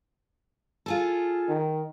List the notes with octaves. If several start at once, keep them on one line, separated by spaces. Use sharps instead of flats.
F4 G#4 A4
D#3